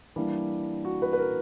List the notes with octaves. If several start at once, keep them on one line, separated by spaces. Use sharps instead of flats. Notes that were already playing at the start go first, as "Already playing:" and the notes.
E3 G3 A#3 D4
F#4
B4
B4
A#4